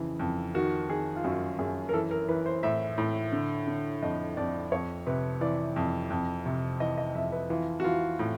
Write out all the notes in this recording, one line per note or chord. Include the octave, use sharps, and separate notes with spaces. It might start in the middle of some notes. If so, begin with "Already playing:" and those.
Already playing: F2 C#3 E3
F2
D#3 F#4
D#3 G#4
F4
F#2 F#4
F#2 G#4
A#4
E3 A4
A#4
E3 B4
C5
A2 E5
A2
D3
D3
F2 D#5
F2 D5
F2 C#5
C3 B4
E3 D5
F2
F2
C3
E3 D#5
D#5
F2 E5
B4
E3 F4
F#4
E3 F4
A2